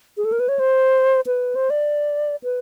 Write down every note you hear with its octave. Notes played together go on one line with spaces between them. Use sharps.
G#4
A4
A#4
B4
C#5
C5
B4
C5
D5
B4